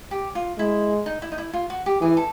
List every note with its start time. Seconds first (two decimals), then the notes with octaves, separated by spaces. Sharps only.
0.11 G4
0.35 F4
0.58 G#3 E4
1.06 D#4
1.22 E4
1.32 D#4
1.38 E4
1.53 F4
1.70 F#4
1.86 G4
2.01 E3 G#4
2.17 A4